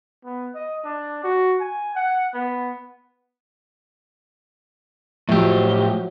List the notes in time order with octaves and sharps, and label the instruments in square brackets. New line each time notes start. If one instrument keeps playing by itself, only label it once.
[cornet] B3
D#5
D4
F#4
G#5
F#5
B3
[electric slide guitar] A2 G4 [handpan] F3 F#3 E5